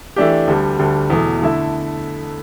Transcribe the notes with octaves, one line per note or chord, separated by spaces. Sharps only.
E3 A3 D4 G4
D2 D3 G3
D2 D3 G3
E2 B2 A3
D3 A3 E4